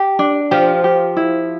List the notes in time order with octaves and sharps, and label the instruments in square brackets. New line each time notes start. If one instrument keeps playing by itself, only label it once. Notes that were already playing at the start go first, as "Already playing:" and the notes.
Already playing: [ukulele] G4
D4
[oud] F3 [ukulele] G4
[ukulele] G4
E4